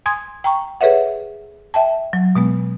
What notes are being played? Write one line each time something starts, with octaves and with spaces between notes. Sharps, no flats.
G#5 C6 D#6 G#6
G5 A#5 C#6
G#4 A4 B4 C#5 E5 F#5
E5 G5 A5
F#3
B2 G#3 B3